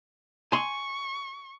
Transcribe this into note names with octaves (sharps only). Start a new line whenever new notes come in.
G#5 C6 C#6